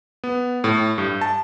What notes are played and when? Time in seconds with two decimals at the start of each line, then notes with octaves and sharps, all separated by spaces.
0.24 B3
0.64 A2
0.98 G2
1.21 A5